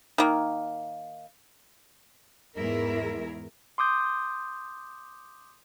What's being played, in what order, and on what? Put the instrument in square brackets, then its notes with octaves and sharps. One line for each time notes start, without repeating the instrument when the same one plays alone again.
[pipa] D#3 A#3
[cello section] E2 G#2 E4 G#4 A#4 E5
[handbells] C6 D6 D#6 G6